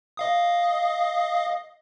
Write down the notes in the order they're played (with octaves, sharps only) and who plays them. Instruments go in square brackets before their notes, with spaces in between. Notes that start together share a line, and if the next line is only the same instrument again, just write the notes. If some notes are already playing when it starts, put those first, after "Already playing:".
[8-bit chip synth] D#5 F5 D#6